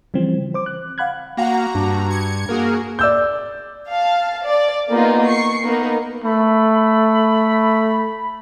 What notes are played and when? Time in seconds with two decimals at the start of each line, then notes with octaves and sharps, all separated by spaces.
0.14 C#3 E3 F3 G3 C4
0.54 C5 D6
0.66 F#6
0.98 F5 F#5 B5 F#6 G#6
1.37 A#3 F#4 F5 F#5 A#5
1.75 G2 D4
2.10 G#6 C#7
2.49 A#3 F#4 G#4 A#4
2.99 D5 E6 G6
3.90 F5 A5
4.45 D5
4.89 A#3 B3 D#4 F4 G#4 A#4
5.26 C#6 C7 C#7
5.64 A#3 B3 D#4 A#4
6.24 A3 B5